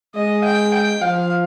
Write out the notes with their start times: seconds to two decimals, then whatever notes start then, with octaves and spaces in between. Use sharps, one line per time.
0.15 G#3 D#5
0.44 G5
0.73 G5
1.02 F3 F5